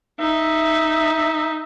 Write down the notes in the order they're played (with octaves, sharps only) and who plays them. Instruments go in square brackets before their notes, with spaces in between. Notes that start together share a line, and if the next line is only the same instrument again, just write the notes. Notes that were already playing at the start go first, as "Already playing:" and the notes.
[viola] D#4 [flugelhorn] E5